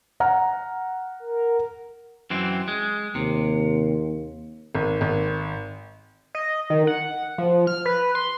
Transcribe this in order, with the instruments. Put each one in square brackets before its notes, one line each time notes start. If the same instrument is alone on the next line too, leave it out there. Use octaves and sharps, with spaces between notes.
[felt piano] F#5 A#5 F6
[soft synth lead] A#4
[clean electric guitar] F#2 E3 C4
G#3
[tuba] D#2 [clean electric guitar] C3
[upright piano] G#1
G#1
[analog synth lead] D#5
D#3
F#5
F3
F6
B4
C6